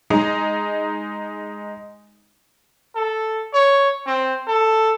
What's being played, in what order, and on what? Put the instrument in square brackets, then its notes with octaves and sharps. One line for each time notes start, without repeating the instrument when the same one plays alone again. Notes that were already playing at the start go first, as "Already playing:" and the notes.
[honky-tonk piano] G#3 D#4
[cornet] A4
C#5
C4
A4